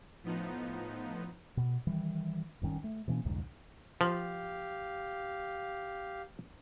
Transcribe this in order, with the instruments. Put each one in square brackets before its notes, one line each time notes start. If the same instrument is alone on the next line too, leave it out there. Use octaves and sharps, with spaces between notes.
[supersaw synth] A2 F3 B3 D#4
[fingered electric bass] B2
D#3 E3 G3
F#1 G2 D#3 C#4
A3
B2 E3 A#3 C#4
C2 F2 G#2 D3
[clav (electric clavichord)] F3 [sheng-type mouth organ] G4 F5